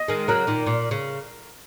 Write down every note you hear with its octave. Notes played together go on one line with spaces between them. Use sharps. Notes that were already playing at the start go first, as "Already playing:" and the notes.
Already playing: D#5
D#3 G#3
C#3 F#3 A#4
A#2 D#3
A#2
C#3